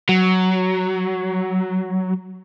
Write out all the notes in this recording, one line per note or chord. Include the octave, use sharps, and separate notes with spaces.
F#3